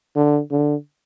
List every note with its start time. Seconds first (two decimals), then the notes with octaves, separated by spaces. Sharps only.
0.16 D3
0.51 D3